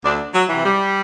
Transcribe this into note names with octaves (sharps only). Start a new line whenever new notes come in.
D2 D4
F#3
C3 E3
G3